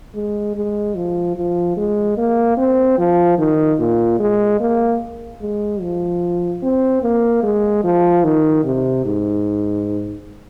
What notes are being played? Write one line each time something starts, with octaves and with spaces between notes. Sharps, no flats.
G#3
G#3
F3
F3
G#3
A#3
C4
F3
D#3
A#2
G#3
A#3
G#3
F3
C4
A#3
G#3
F3
D#3
C3
G#2